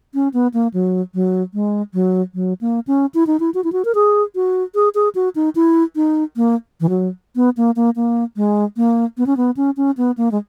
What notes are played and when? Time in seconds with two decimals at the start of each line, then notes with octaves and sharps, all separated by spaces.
0.14 C#4
0.34 B3
0.54 A#3
0.74 F#3
1.14 F#3
1.54 G#3
1.94 F#3
2.35 F#3
2.61 A#3
2.87 C#4
3.14 E4
3.27 D#4
3.40 E4
3.54 F#4
3.64 E4
3.73 F#4
3.85 A#4
3.95 G#4
4.35 F#4
4.75 G#4
4.95 G#4
5.15 F#4
5.35 D#4
5.55 E4
5.96 D#4
6.37 A#3
6.81 E3
6.89 F#3
7.36 B3
7.57 A#3
7.76 A#3
7.96 A#3
8.36 G#3
8.77 A#3
9.18 B3
9.27 C#4
9.37 B3
9.57 C#4
9.77 C#4
9.97 B3
10.17 A#3
10.32 G#3